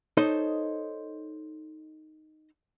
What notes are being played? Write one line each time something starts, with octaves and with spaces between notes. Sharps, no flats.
D#4 A4 C5 C#5 D#5